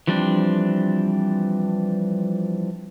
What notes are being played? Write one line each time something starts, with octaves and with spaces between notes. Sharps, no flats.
E3 F3 G3 C4 D4